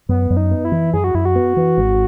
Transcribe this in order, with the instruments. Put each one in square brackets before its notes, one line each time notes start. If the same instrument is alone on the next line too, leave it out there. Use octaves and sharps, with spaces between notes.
[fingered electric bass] F#2 [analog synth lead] B3
[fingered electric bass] F#2
[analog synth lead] D#4
[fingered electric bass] B3
[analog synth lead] E4
[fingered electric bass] E3
[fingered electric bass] F#2 [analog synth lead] G#4
[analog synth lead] F#4
[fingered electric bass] F#2 [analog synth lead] E4
[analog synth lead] F#4
[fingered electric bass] B3
E3
G#1